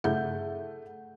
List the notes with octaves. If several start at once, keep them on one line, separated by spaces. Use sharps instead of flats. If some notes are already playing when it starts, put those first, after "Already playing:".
G2 C#3 A3 E4 G#4 F#5 G6